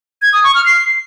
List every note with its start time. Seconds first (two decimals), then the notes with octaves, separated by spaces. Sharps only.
0.22 G#6
0.33 D#6
0.44 C#6
0.55 F6
0.66 C7